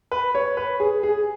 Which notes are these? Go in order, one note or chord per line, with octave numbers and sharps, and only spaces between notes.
B4
C#5
B4
G#4
G#4